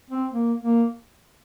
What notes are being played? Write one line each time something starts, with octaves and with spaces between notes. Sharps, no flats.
C4
A#3
A#3